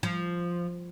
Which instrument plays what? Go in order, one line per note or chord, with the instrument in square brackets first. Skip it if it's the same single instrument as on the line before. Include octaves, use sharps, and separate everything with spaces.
[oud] F3